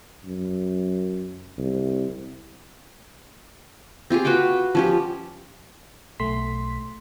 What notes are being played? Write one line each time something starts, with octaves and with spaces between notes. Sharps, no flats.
F#2
C2
C4 F4 G4 G#4
F#4 B4 F5 G5
F3 C#4 G4
B1 A3 C6 B6